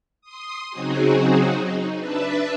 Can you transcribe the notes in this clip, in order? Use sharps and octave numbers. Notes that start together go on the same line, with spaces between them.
C6 D#6
C#3 F#3 C4 D#4 F#4 G#4
D#4
D4 B4 E5 A5